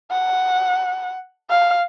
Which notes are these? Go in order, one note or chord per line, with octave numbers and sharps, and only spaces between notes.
F#5
F5